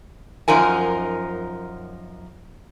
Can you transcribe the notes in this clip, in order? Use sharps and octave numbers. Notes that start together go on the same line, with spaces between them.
F#2 F3 D#4 A#4 G#5